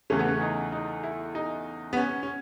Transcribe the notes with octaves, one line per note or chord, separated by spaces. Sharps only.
E2 C#3 E3 A3 C#4
B3
C#4
D#4
D#4
E4
D#4
B3
C#4
C#4